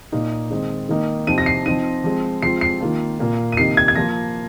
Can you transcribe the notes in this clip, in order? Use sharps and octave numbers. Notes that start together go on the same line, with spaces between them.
A#2 A#3 D#4
D#3 G#3 C4 D#4
D#3 A#3 D#4
C3 F3 C4 D#4 D#7
A#6
C7
F3 C4 D#4 D#7
F3 G#3 C4
F3 G#3 C4 F4 C7
C7
D#3 A#3 F4
A#2 A#3 F4
D#7
C3 D#3 A#3 D#4 C7
G#6
G#6
F3 A#3 F4 A#6